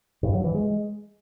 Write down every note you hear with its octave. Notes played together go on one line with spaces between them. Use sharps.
G2
F#3
E3
G#3